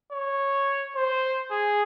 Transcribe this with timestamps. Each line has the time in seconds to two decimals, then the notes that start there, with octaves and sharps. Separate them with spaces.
0.12 C#5
0.96 C5
1.51 G#4